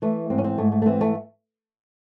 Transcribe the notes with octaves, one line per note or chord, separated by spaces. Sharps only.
E3 A3
G#2 C4
C#4
C4
G#2 A3
A3
A3
E3 C4
A3